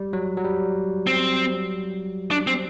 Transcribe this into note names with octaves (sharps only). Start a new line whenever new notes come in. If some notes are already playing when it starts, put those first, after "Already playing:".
Already playing: G3
F#3
F#3
G3
C4
D4
C4